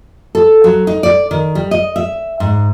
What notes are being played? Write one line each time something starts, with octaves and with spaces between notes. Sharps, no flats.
A4
F#3
D#4
D5
D#3
G3
D#5
E5
G#2